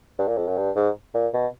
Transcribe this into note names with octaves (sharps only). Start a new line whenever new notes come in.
G2
A#2
F2
F#2
G2
G#2
A#2
B2